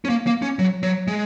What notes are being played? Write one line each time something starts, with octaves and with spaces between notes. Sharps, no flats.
C#4
A#3
A#3
C#4
F#3
F#3
G#3